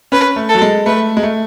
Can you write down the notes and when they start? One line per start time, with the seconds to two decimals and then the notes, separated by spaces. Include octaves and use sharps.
0.12 C#4 B4
0.36 A3
0.49 A4
0.55 F#3
0.62 G#3
0.86 A3 B4
1.17 G#3
1.23 A3